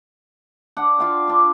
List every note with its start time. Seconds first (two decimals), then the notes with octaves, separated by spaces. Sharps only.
0.77 D4 F#5
0.99 F4 F5 G5
1.28 D4 C6